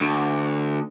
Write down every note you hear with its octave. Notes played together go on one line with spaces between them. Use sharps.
D2